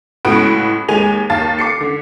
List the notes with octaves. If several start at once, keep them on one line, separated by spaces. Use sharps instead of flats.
C#2 A2 B3 F#4 B5 D7
D#2 G#3 G#5 F7
D#2 F5 A5 A6
D6 C7 C#7
D3